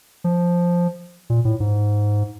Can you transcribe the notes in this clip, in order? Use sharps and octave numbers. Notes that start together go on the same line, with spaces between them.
F3
A#2
A2
G#2